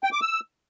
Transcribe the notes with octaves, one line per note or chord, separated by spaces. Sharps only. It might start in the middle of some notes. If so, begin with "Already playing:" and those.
G5
D6
E6